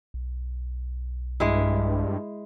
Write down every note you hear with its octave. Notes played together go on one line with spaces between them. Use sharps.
B1
G2 G#3 E4